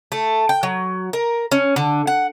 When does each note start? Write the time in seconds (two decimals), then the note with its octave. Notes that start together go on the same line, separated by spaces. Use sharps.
0.12 A3
0.49 G5
0.63 F#3
1.13 A#4
1.52 C#4
1.76 D3
2.07 F#5